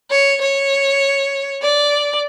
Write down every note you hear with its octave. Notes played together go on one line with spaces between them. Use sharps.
C#5
C#5
D5